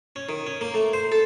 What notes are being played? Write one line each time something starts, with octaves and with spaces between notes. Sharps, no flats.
C#4
D#3
C#4
A#3
A3
C5
A4